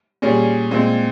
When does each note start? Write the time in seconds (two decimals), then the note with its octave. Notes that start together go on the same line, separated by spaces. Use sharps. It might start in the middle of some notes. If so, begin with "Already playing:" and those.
0.22 A#2 G3 C#4 G#4
0.71 A#2 G#3 C4